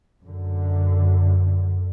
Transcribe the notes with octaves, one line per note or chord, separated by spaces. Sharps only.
F#2 D3